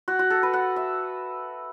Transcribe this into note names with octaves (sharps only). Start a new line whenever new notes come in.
F#4
F#4
A4
B4
F#5
E5